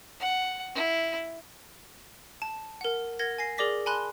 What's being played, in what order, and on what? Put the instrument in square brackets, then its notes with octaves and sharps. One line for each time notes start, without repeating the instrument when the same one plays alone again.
[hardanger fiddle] F#5
E4
[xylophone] A5
A#4 F#5
A#4 F#5 G#6 A#6
G#5 A#6 C7
G#4 A#4 D5 D6 A#6 B6
G#5 A5 B5 C6 F#6 G7